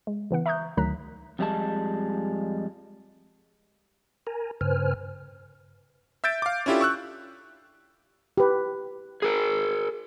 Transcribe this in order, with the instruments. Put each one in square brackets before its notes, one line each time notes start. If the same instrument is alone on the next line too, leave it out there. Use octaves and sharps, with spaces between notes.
[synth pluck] G#3
C#3 E3 B3 F#5
E5 A#5 C#6 D#6 F#6 G6
D2 D#3 F#3 A#5 F#6 B6
[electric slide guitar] F2 G3 G#3 A5
[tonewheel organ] A#4 G#5 A#5
G2 C#3 B4 C5 G#5 F6
[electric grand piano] E5 E6 G6 A6 D7
F5 D6
C#4 D4 E4 F4 G4 A4
C#6 E6 F#6
[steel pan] G4 B4
[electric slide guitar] G#4 A#4